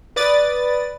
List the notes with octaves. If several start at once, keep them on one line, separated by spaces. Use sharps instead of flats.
B4 D5 D#6 A6